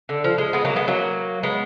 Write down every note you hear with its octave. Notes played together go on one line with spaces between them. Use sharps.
D3
F3
G#3
G#3 B3
F#3 A#3
G#3 B3
F#3 A#3
G#3 B3